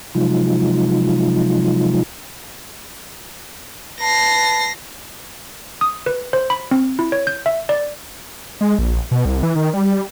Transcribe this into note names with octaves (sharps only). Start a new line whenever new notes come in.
C3 F3 F#3 G#3 D#4 F4
B4 A5 A#6 C7
D#6
B4
C5
B5
C4
E4
C#5
G6
E5
D5
G#3
A#1
B2
C2
E3
D#3
G3